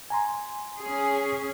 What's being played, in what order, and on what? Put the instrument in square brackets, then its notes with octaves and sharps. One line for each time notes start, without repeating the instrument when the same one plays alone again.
[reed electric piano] G#5 A#5 C6
[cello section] C#4 G#4